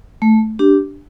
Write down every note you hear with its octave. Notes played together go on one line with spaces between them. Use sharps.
A3
D4 G4